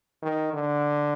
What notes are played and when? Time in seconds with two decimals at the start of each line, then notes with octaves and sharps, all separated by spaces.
0.23 D#3
0.53 D3